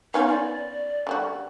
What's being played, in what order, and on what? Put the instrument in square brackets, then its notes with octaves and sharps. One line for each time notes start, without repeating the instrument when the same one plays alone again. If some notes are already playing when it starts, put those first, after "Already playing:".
[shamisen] B3 C#4 F4 [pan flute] D#4
[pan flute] D5
[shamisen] D3 G3 F#4